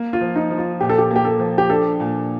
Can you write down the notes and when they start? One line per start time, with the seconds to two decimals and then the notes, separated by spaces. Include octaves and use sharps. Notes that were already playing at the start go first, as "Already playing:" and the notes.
Already playing: A#3
0.13 F4
0.21 F3
0.36 D#4
0.50 F3
0.58 F4
0.81 A#2 G4
0.90 A4
0.98 G4
1.10 A#3
1.16 G4
1.25 A4
1.39 F3
1.58 G4
1.70 D4 A4
2.00 A#2